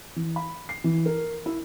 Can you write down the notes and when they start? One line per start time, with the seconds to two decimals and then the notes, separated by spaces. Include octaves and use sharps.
0.16 E3
0.36 B5
0.69 C7
0.84 E3
1.06 A#4
1.46 E4